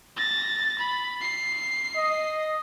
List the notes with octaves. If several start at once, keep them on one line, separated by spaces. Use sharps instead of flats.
A6 A#6
B5
C7
D#5